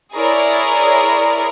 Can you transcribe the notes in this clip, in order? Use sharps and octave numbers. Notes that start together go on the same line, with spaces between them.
E4 G#4 A#4 C#5 D5